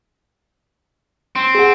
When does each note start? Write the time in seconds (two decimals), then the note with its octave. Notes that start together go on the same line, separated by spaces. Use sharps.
1.36 C4 C6
1.55 G#4 F#5